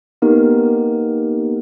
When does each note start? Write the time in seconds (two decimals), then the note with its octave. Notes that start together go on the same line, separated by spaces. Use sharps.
0.22 A#3 B3 D#4 G4 A#4